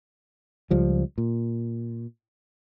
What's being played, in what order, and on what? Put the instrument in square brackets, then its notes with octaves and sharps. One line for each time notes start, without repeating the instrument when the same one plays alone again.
[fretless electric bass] C#2 F3 G3
A#2